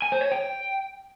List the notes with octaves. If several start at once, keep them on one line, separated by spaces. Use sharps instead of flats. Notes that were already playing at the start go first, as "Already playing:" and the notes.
G#5
C5
C#5
G5